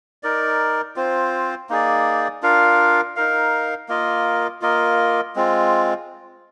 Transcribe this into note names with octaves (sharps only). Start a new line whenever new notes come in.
D#4 A#4 D5
C4 F4 C5
A#3 D#4 G#4 D5
D4 F4 A#4 F5
D#4 A#4 F5
A#3 F4 A#4 D#5
A#3 F4 A#4 D#5
G#3 C4 F4